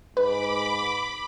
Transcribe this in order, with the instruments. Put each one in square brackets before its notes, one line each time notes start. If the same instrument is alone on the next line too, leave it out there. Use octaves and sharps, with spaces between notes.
[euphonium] G#2 [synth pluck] B4 [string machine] B5 D6